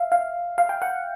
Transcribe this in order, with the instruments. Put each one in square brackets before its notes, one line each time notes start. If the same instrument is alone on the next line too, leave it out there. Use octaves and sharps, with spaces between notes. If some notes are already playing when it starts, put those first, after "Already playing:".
Already playing: [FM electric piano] E5 F5
F5
F5
G5
F#5